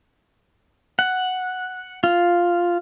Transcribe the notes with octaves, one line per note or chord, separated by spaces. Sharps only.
F#5
F4